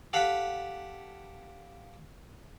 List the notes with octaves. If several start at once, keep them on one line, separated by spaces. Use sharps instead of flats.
G4 A4 F5 F#5 B5